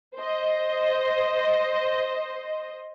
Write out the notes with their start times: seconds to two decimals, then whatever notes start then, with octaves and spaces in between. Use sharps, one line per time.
0.16 C5 D#5